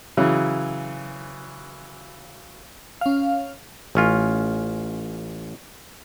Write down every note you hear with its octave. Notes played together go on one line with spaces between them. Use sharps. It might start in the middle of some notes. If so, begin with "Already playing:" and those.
C#3 E3 F#3
C#4 F5
A1 C#4 F4